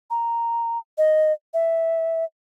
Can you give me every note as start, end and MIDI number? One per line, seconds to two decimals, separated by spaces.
0.10 0.78 82
0.98 1.32 75
1.54 2.25 76